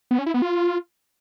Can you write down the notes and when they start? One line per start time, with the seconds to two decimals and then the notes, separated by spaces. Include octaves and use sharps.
0.11 B3
0.19 C#4
0.26 E4
0.34 B3
0.42 F4